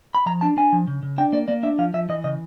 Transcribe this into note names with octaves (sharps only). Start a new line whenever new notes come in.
B5
F3 A#5
D4 A5
D4 G#5
F3
C#3
C#3
D4 G5
A#3 D5
A#3 D5
D4 E5
F3 F5
F3 E5
E3 D#5
C#3 D#5